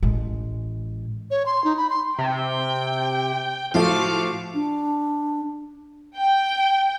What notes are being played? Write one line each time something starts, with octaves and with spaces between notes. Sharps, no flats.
A1 G#3
C#5
C6
D#4
B5
C6
C3 G5
A2 F3 A3 F#4 F5 D6
D4
G5